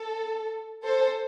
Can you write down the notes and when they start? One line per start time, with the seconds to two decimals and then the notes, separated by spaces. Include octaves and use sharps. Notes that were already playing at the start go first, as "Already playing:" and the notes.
Already playing: A4
0.84 A4 C5